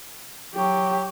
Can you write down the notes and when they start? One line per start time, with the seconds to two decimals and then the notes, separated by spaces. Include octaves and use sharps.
0.55 F#3 G4